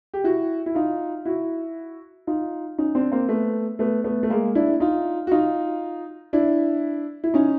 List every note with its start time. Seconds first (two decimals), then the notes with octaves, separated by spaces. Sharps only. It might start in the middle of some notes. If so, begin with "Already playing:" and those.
0.14 G4
0.24 E4 F#4
0.66 E4
0.75 D#4 F4
1.25 E4 F#4
2.27 D#4 F4
2.78 C#4 D#4
2.95 C4 D4
3.12 A#3 C4
3.29 A3 B3
3.79 A3 B3
4.04 A3 B3
4.23 A3
4.30 G#3 A#3
4.55 D4 E4
4.80 D#4 F4
5.27 F#4
5.31 D#4 F4
6.33 D4 E4
7.24 E4
7.34 C#4 D#4